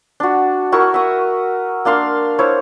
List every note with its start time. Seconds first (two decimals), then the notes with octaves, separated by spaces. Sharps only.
0.20 D4 F#4
0.72 E4 F#4 A#4 C#6
0.94 E5 D#6
1.85 A#3 D4 F5 C6
2.39 E4 C5 C#5